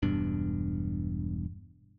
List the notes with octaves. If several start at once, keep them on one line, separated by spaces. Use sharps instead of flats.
E1 G2 B2 D4